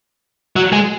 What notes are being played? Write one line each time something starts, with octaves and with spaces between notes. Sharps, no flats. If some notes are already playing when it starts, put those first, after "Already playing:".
F#3
G#3